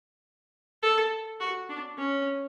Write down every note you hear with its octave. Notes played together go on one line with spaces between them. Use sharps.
A4
F#4
D4
C#4